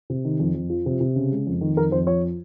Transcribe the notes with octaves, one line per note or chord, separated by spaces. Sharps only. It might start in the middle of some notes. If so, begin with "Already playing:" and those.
C3
D#3
F2
F2
F3
C3
C3
C#3
G#3
F2
D#3
F2 A#4
F2 C5
F3 C#5